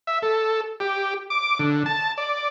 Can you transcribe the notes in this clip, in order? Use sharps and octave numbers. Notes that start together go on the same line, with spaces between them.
E5
A4
G4
D6
D3
A5
D5